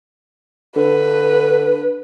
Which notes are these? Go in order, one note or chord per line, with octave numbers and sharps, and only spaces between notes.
D3 B4